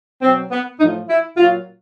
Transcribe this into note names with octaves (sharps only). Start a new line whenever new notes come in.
B2 F#3 C4
B3
A2 F3 D#4
E4
A#2 F#3 F4